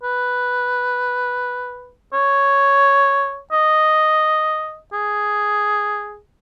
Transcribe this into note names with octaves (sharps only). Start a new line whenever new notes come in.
B4
C#5
D#5
G#4